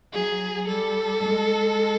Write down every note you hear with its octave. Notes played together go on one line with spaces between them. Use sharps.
F#3 G#4
G3 A4
G#3